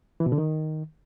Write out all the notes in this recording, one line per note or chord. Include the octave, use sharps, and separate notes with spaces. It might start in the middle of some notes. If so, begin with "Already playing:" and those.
E3
B2
D3
D#3